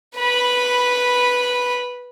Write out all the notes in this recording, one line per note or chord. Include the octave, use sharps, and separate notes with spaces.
B4 B5